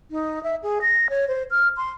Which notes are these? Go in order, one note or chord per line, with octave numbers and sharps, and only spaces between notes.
D#4
E5
G#4
A#6
C#5
C5
F6
C6